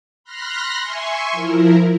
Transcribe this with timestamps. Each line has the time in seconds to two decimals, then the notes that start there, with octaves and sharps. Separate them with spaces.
0.24 B5 C6 F6 F#6 A#6
0.80 E5 G#5 C6 C#6
1.32 F3 E4 A#4